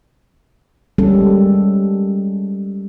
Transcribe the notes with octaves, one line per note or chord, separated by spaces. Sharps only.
G3 G#3 A#3 C#4 G#4 A4